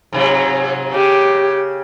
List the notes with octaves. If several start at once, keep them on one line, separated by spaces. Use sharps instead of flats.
G#2 C3 F#3
C#3 G4